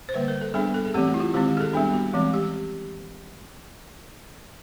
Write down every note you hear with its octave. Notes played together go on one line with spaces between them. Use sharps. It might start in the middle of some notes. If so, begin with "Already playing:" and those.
C5
D3 G3 A#3 B4
A#4
A4
G3 B3 D4 G#4
A4
G#4
E3 A3 C4 G4
F#4
E4
F4
D#3 G#3 C4 G4
G4
G#4
A4
G3 B3 D4 G#4
F#4
E3 G#3 C4
G4